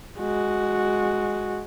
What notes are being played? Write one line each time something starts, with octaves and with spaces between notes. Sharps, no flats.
G#3 F#4